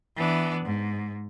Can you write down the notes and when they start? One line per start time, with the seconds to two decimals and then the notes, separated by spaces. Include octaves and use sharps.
0.16 E3 B3 D4
0.65 G#2